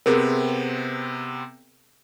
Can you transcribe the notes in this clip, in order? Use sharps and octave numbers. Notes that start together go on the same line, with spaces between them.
C3 B3 C4 G#4 A#4